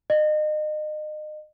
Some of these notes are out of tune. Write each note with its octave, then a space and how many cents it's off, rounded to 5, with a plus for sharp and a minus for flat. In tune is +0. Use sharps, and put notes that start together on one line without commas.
D#5 -30